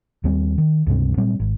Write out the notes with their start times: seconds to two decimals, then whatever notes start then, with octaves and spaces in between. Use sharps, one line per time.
0.24 D#2 G3 C4
0.58 D#3
0.87 C#2 G2 C3 C4
1.17 A#2 F#3 G3 C4
1.40 G#1